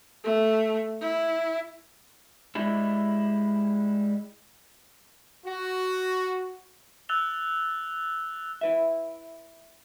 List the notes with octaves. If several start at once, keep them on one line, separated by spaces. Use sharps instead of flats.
A3
E4
G3 G#3 E4
F#4
E6 F#6 A6 F7 G7
E4 B4 E5